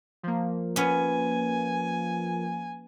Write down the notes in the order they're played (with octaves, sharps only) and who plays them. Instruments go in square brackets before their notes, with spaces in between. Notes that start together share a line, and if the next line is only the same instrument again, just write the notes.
[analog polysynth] F3 A#3
[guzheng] B3 C#4 [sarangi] G#5